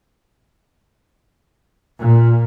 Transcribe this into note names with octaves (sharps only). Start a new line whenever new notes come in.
A#2